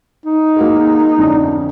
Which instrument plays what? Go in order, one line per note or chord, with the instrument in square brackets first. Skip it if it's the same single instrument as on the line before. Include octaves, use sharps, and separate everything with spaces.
[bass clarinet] D#4
[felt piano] A#3 F#4 G#4
F2 D3 C#4